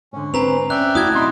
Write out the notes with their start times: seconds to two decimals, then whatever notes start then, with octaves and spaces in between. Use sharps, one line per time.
0.13 G#2 D3 C#4
0.34 C4 B4 G#5 A#5 F7
0.70 C#4 D5 E5 G5 F#6
0.95 A2 E4 F#4 D#6 F#6 G#6
1.15 B1 C4 D#4 B5 C6